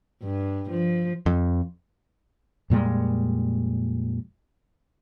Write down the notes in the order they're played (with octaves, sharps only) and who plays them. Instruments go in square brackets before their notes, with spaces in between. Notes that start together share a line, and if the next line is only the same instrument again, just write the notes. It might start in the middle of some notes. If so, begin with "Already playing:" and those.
[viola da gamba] G2
F3
[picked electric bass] F2
[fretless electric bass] F2 A#2 G3 G#3